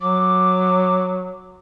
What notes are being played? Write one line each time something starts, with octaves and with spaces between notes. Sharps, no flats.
F#3 D6